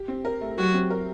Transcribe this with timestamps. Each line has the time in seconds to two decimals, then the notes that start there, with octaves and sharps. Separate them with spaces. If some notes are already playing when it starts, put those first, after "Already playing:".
Already playing: G4
0.08 C4
0.25 A#4
0.41 A3
0.57 F#3 F#4 G4
0.74 C4
0.90 A#4